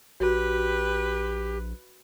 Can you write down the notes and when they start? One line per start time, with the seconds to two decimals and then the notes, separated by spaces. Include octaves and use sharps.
0.20 A#1 F#4 G4 B4 C#5